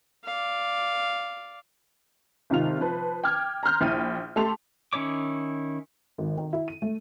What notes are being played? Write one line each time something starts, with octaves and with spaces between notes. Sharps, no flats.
D5 F5
G#1 C3 D#3 F4 F7
F3 B4
G5 D6 F6 G#6
A#5 C6 F6 G6
A#1 E4 G5 D#7
A3 G4 A4 A5 C6 F7
D#3 C#4 E4 C#5 D6
G#1
D#3
E4
D#7
A3